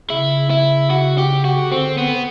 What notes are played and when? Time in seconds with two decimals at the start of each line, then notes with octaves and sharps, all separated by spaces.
0.10 C#3 E4
0.51 E4
0.90 F#4
1.18 G4
1.45 F#4
1.71 D3 C4
1.98 B3